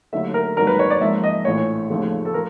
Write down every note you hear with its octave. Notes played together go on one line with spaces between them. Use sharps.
D#2 D3 F#3 A3 E5
A#4
G#1 G2 D#3 F#3 A#3 A#4
B4
C#5
D5
G#1 G#2 F3 A#3 E5
D#5
A#1 A2 E3 C#5
F1 D#2 C#3 F3 A3
A4
F3 A#4